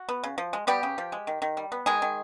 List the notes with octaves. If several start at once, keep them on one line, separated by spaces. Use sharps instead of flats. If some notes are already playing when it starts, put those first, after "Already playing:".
Already playing: F#4
B3
C#3
F3
G#3
G3 B3 G4
C#3
F3
G#3
D#3
D#3
G3
B3
D#3 G#3 G#4
D#3